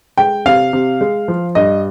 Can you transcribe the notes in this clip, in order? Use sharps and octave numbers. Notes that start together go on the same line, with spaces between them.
G#3 G5
C3 F5
C3
G#3
F3
G2 D#5